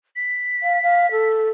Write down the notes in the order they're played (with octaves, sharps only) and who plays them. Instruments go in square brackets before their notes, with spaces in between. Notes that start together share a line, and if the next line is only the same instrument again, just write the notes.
[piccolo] B6
[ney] F5
F5
A4